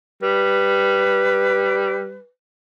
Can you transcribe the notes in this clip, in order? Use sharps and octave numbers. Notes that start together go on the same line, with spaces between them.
G3 B4